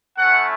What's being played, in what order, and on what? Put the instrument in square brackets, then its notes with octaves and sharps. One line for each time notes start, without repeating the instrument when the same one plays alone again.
[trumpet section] A3 C#4 E4 F#5